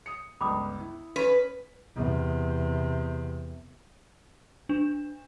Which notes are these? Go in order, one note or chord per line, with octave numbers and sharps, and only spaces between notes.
D#6 C#7
G1 C#2 B5 D6 D#6
E4
C#4 B4
E2 C3
D4